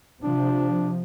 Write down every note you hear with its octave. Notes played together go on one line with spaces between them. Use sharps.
C3 F3 D4